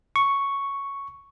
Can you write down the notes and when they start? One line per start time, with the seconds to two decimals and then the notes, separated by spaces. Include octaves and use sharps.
0.16 C#6